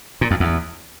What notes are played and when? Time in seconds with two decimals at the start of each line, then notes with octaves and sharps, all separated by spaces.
0.21 A#2
0.31 F2
0.40 E2